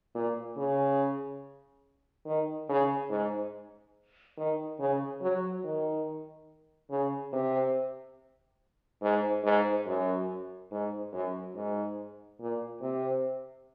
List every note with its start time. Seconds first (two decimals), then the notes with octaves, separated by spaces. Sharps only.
0.15 A#2
0.57 C#3
2.26 D#3
2.69 C#3
3.10 G#2
4.38 D#3
4.80 C#3
5.22 F#3
5.64 D#3
6.91 C#3
7.33 C3
9.02 G#2
9.44 G#2
9.87 F#2
10.71 G#2
11.13 F#2
11.56 G#2
12.41 A#2
12.82 C3